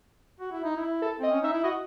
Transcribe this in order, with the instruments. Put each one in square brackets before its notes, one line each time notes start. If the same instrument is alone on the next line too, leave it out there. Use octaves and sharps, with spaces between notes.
[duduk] F#4
E4
D#4
E4
[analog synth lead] A4
[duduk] C4 [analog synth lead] D#5
[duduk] C#4
[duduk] D#4 [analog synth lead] E5
[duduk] E4
[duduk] F#4 [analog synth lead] D#5